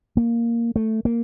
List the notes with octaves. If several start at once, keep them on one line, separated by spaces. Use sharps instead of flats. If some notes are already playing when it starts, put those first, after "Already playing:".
A#3
A3
A#3